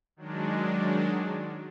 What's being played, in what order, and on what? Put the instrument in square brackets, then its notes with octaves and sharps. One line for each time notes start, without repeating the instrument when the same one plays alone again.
[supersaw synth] D#3 F#3 G#3 D4